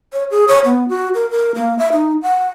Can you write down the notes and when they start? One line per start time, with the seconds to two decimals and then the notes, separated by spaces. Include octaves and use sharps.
0.13 C#5
0.31 G#4
0.48 C#5
0.65 B3
0.89 F#4
1.14 A#4
1.31 A#4
1.55 A#3
1.79 E5
1.92 D#4
2.23 F#5